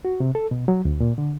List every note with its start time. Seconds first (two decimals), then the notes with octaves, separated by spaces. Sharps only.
0.05 F#4
0.20 C3
0.35 A4
0.51 B2
0.68 F#3
0.85 D2
1.00 A#2
1.18 D3